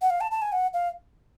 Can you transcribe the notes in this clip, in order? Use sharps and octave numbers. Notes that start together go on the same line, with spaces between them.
F#5
F5
A5
A5
G#5
F#5
F5